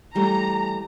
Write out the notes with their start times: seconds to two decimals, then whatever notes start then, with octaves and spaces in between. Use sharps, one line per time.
0.15 E3 G3 A3 A#5